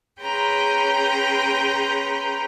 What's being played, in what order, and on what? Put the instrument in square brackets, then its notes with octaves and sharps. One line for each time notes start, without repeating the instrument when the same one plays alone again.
[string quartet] C#4 G#4 B4 G5 A#5 C6